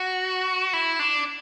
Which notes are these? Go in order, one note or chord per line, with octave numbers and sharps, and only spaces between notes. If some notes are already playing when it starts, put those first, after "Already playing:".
Already playing: F#4
E4
D4